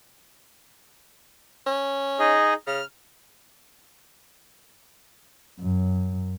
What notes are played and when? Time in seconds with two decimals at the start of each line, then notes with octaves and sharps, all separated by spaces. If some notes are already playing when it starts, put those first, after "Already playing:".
1.67 C#4
2.19 D#4 G#4 D#5
2.67 C#3 F6
5.60 F#2